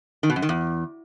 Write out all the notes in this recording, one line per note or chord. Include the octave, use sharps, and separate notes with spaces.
D#3
B2
F#2
D#3
E2